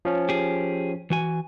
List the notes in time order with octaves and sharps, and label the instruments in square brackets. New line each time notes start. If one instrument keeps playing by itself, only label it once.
[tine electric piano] F3 C#4
[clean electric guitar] G4 G#4
E3 F#4 G#5